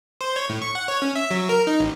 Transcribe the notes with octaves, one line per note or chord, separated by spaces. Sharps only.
C5
C#5
A2
C#6
F#5
C#5
C#4
E5
F#3
A#4
D#4
A1